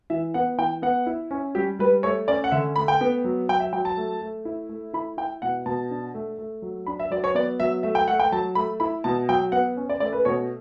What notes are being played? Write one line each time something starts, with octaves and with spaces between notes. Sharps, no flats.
E3 E5
B3 F#5
E3 G5
B3 F#5
E4
C#4
G3 G4
G3 B4
A3 C#5
C#4 D5
F#5
D3 E5
A3 B5
G5
B3
F#3
F#3 G5
E5
F#3 G5
A5
A3
A3
E4
A3
E4 B5
E4 G5
B2 F#5
B2 A5
D4
A3
A3
F#3
D4 B5
E5
F#3 D5
C#5
B3 D5
F#3 E5
A3 E5
G5
A3 F#5
G5
F#3 A5
A3 B5
E4 B5
B2 A5
F#3 G5
B3 F#5
C#4
D5
A3 D5
B4
B2 C#5